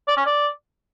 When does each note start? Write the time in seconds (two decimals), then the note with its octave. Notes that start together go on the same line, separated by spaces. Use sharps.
0.08 D5
0.17 C#4
0.26 D5